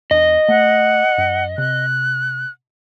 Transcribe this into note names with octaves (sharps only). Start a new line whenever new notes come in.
E2 D4 D#5
A3 F#5
F#2
C3 F#6